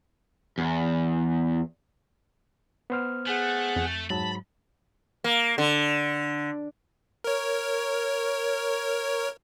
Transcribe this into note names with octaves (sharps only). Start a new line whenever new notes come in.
E2
B3 C5 F6
A3 G#4 F#5 F#6
F2
G#2 F#3 A5 B5
A#3
D3
A#4 C#5